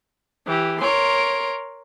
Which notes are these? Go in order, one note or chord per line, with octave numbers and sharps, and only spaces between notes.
E3 G4
A#4 C#5 C6 D7